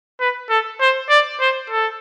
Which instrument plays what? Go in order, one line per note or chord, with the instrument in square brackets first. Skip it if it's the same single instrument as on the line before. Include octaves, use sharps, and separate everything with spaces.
[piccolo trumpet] B4
A4
C5
D5
C5
A4